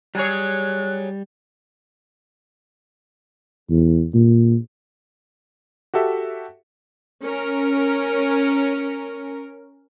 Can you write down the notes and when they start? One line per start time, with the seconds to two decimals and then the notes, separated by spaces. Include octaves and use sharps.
0.15 F#3 G3 G#4 C#5 F#6
3.70 E2
4.14 A#2
5.94 F#4 G4 A4 E5
7.22 C#4 A#4